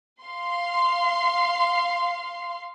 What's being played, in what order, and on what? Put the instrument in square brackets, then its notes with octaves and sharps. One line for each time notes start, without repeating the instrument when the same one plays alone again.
[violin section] F5 C6